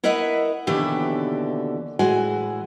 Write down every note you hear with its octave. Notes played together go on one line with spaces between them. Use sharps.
E4 A#4 B4 D#5 E5 F#5
D#2 B2 D3 E3 E4 G4
A2 E3 G#3 F#4 G#5